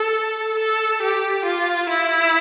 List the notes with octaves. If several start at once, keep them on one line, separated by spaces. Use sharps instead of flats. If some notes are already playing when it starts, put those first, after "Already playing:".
Already playing: A4
A4
G4
F4
E4